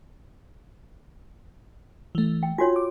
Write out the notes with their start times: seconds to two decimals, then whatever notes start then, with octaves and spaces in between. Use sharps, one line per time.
2.15 E3 A3
2.43 G5
2.58 F4 F#4 C#5 G#5
2.76 D6